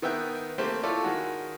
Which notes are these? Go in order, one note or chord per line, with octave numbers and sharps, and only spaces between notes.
D#3 B3 E5 G5 F#6
A3 A#3 C4 G4 C5
E4 F4 A4 C#5 D5
D#3 G#3 F#4